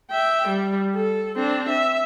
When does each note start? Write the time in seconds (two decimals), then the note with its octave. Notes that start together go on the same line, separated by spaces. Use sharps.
0.11 E5 G5
0.49 G3
0.95 A4
1.36 C4 D4
1.69 E5